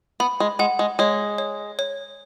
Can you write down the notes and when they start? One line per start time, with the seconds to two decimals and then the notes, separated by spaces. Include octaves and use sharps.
0.20 B3 B5
0.40 G#3
0.59 G#3 F#5
0.79 G#3
0.99 G#3 C#5
1.38 C#5
1.79 C#5